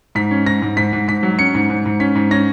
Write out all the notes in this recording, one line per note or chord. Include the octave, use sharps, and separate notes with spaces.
G#2 B6
C#4
G#2 A#6
G#2
G#2 B6
G#2
G#2 B6
F#3
C#4 C#7
G#2
G#2
G#2
C#4 B6
G#2
C#4 A#6